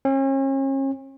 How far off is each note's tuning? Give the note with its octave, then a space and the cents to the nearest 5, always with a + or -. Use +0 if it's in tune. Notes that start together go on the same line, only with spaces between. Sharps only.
C#4 -40